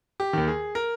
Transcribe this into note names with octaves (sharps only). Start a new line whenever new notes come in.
G4
D#2 D#3
G#4
A#4